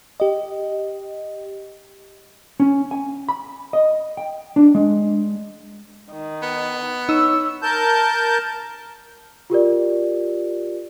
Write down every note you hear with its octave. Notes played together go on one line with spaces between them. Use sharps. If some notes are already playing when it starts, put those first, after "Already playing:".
G4 D#5
C#4
G#5
B5
D#5
G5
D4
G#3
D#3
B3
D#4 C#5 E6
A#4 A5 G6
F4 G4 A#4 D5